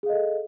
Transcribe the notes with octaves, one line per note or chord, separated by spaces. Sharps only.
G#4 A4 D#5 F5